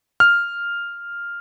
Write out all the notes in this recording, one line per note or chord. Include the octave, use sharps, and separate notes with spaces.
F6